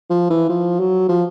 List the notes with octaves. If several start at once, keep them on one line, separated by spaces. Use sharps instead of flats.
F3
E3
F3
F#3
F3